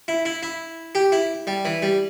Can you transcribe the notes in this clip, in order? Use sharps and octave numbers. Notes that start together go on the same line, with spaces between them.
E4
E4
E4
G4
E4
G3
E3
G3